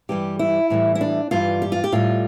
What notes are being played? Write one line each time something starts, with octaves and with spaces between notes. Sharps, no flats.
G2 E3 G3 G4
E4
A2 E3 G3
E4
D4
G2 E3 G3 F4
G4
F4
G4
A2 G3 F4